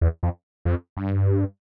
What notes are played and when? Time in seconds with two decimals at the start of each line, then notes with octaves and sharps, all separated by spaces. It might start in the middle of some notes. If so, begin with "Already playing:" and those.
0.01 E2
0.23 F2
0.65 F2
0.97 G2